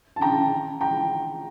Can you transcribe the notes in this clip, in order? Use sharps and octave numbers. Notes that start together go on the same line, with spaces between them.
A5
G5 A#5
G5 A#5